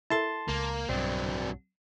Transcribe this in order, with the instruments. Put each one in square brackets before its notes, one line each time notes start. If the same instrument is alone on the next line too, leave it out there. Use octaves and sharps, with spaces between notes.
[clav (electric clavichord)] E4 A4 A#4 [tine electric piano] A5 C6 A6
[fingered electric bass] C#2 [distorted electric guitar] A#3
[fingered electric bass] B1 G2 [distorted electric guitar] F#3 D4 [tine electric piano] C4